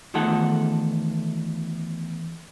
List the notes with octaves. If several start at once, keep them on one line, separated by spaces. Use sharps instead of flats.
E2 D#3 F3 A3 A4 F#5